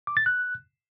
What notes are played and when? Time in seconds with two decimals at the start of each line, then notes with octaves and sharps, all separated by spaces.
0.07 D6
0.17 A6
0.26 F#6